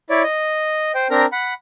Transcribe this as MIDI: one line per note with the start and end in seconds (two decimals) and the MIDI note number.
0.10 0.23 64
0.10 0.23 73
0.10 0.23 74
0.23 0.92 75
0.95 1.08 72
0.95 1.08 79
1.10 1.26 60
1.10 1.26 62
1.10 1.26 70
1.10 1.26 82
1.32 1.54 78
1.32 1.54 83